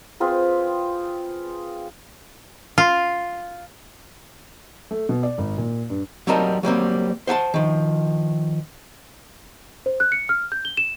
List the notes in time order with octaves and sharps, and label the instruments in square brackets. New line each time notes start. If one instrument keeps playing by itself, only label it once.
[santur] C4 F4 G#4 B4
[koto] F4
[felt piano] A3
B2
D5
G#1
A#2
G2
[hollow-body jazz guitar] F#3 G3 C4 D#4 A#4 A5
F#3 G3 A#3 C4
C5 F#5 G#5 A5
D#3 F3
[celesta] C5
F#6
C#7
F6
G6
G7
E7